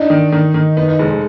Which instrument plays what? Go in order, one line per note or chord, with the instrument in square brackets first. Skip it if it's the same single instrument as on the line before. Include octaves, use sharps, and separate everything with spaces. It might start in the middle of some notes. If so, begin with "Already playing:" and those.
Already playing: [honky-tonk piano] D4 [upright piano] D#4
[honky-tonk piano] D#3
D#3
D#3
[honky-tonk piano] B3 [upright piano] D#4
[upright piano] D#4
[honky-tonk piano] F1 [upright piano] G#3
[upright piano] G#3